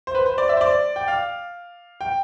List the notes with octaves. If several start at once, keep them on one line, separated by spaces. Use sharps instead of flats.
C5
B4
C5
D5
E5
C5
D5
G5
F5
G5